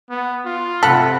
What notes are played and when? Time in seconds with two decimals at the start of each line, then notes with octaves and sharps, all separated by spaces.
0.10 B3
0.45 F4
0.83 C3 A4 F#5 B5